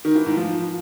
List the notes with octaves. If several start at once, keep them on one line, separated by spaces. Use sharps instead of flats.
D#3
E3
G#2
F3